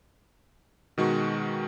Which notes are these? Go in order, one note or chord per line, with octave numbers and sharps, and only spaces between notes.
B2 D#3 G#3 F#4 C#6